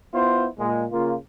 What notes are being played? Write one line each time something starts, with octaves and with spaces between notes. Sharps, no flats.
B3 E4 F4 C5
A#2 G#3
C#3 A#3 F4